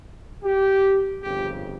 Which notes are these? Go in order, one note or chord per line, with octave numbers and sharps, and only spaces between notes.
G4
G1 F2 C#3 G4